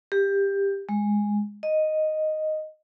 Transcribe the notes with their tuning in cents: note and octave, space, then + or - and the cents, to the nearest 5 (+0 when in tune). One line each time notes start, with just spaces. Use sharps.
G4 +15
G#3 -5
D#5 -5